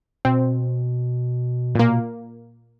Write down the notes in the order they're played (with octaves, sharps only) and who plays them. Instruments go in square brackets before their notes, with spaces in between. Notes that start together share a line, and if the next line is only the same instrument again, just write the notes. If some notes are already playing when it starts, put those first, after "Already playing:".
[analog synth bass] B2 [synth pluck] C4
[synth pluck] A#2 A#3